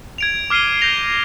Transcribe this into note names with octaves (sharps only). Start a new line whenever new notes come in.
G#6 D7 F7
D6 F6 C7 D#7 G7
G6 A#6 F7